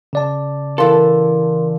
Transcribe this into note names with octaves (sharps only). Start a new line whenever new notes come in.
C#3 D5 A5
E3 A4 A#4 F5 C6